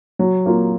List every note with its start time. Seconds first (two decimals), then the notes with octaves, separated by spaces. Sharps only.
0.19 F#3
0.46 A#3 F4